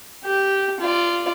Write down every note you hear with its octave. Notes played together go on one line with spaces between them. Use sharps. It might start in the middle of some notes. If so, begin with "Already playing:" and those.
G4
F4 D5